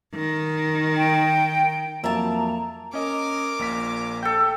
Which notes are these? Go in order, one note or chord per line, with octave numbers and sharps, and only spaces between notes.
D#3
G5
F2 F#3 A#3 E5 A5 A#5
C#4 A#4 D#5 D6
A#1 A#2 B6
A4 G5